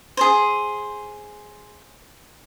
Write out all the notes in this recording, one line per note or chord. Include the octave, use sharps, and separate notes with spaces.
G#4 C5